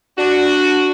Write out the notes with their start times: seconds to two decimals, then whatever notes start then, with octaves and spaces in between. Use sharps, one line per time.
0.18 D4 F#4